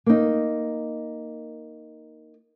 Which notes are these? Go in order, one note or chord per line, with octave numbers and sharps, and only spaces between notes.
A#3 D#4